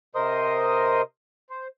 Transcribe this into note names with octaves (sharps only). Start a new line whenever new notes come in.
C3 A#4 C5 D#5 C6 D#6
C5